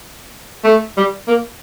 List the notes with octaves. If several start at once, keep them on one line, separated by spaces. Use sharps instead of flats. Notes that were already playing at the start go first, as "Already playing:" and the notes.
A3
G3
A#3